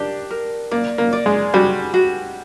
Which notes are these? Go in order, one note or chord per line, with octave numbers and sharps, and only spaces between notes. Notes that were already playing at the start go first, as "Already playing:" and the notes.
Already playing: D4 G4 A#4
A#4
A#3 D5
A#3
D5
G#3
G3 F#4
F#4